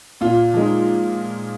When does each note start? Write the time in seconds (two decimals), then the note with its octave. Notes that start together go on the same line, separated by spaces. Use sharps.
0.21 A#2 F4
0.53 F3 G#3 D#4